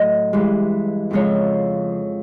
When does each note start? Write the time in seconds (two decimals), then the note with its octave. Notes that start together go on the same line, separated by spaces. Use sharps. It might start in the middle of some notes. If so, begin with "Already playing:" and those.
Already playing: A2 F#3 D#5
0.33 G2 E3 G#3
1.11 F2 C#3 F3 G#3 C#5